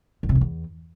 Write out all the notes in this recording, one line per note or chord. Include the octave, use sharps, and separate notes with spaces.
F#2
C3
F2
E2